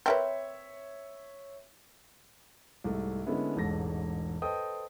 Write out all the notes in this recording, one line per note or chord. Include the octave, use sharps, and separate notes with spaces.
C4 A#4 B4 C#5 E5
C2 G#2 A3
D3 G#3 A#3 B3 C#4 E4
E1 A1 G#2 A4 A#6
A4 B4 C5 D#5 G5 D#6